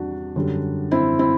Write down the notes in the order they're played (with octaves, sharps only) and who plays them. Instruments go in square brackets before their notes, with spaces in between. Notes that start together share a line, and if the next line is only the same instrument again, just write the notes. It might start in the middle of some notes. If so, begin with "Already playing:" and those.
Already playing: [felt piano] E2 C3 G3 D4 F#4
F#2 D3 G3
C4 E4
C4 E4